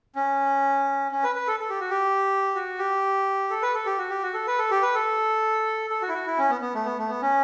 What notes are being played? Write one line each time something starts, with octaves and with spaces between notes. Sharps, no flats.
C#4
C#4
B4
B4
A4
A4
G4
F#4
G4
F#4
G4
A4
B4
A4
G4
F#4
G4
F#4
A4
B4
A4
G4
B4
A4
A4
F#4
E4
F#4
E4
C#4
B3
B3
A3
B3
A3
B3
C#4